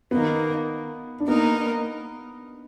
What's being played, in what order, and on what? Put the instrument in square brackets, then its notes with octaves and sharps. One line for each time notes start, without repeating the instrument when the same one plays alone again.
[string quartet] D#3 A#3 D#4 [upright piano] B3
[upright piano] D4
[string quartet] A#3 D#4 A#4 [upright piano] B3